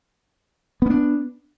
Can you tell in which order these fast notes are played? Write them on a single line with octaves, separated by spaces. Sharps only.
B3 C#4 D4